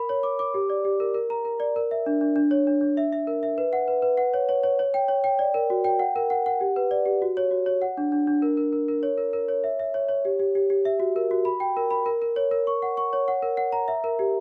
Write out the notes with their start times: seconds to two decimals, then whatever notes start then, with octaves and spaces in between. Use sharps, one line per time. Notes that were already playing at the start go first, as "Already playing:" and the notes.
Already playing: A#4 B5
0.09 C#5
0.23 D6
0.39 D6
0.54 G4
0.70 D5
0.85 G4
1.00 A#4
1.14 A#4
1.30 A#5
1.45 A#4
1.60 D5
1.76 A#4
1.91 E5
2.06 D4
2.21 D4
2.36 D4
2.51 C#5
2.67 D4
2.81 D4
2.97 E5
3.13 E5
3.27 A#4
3.43 E5
3.58 B4
3.73 F#5
3.88 B4
4.02 B4
4.17 F#5
4.34 C#5
4.49 C#5
4.63 C#5
4.79 C#5
4.94 G5
5.08 C#5
5.24 G5
5.39 D5
5.54 A#4
5.70 F#4
5.84 G5
5.99 F#5
6.16 A#4
6.30 F#5
6.46 F#5
6.61 G4
6.76 B4
6.91 D5
7.06 G4
7.22 F#4
7.37 C#5
7.51 F#4
7.66 C#5
7.82 F#5
7.97 D4
8.12 D4
8.27 D4
8.42 A#4
8.57 A#4
8.73 A#4
8.88 A#4
9.03 C#5
9.18 A#4
9.33 A#4
9.48 C#5
9.64 E5
9.80 E5
9.94 C#5
10.09 C#5
10.25 G4
10.39 G4
10.55 G4
10.70 G4
10.85 E5
11.00 F#4
11.16 A#4
11.31 F#4
11.45 B5
11.60 G5
11.77 A#4
11.91 B5
12.06 A#4
12.22 A#4
12.36 C#5
12.51 A#4
12.67 C#6
12.82 F#5
12.97 C#6
13.13 C#5
13.28 F#5
13.42 A#4
13.57 F#5
13.72 A#5
13.88 E5
14.04 A#4
14.19 G4